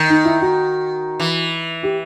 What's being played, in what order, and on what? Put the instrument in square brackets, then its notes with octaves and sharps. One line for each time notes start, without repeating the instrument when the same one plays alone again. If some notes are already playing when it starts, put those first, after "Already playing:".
Already playing: [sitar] D#3
[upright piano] D#4
E4
F#4
[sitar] E3
[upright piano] G4